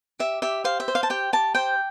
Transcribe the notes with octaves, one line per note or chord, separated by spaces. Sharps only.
G4 E5
G4 E5
C5 F5
E5
C5
F5
A5
G4 G5
G4 A5
C5 G5